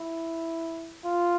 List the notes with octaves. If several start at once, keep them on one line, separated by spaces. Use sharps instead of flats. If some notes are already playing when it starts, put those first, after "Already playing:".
Already playing: E4
F4